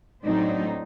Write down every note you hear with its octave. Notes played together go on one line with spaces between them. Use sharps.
A2 F#3 C4 D4 D#4